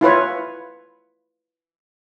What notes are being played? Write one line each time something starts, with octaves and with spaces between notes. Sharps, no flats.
E4 F4 B4 C#5